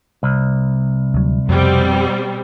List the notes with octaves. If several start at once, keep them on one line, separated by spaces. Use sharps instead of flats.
C2
D2 F#3
F2 B2 G3 C4